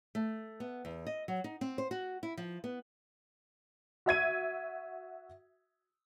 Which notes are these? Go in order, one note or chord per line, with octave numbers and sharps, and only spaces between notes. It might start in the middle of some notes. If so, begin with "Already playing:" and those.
A3
B3
E2
D#5
F#3
D#4
C4
C5
F#4
E4
F3
B3
F#4 E5 G#6 D#7